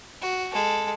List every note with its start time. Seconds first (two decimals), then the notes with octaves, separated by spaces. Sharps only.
0.21 F#4
0.53 G#3 A4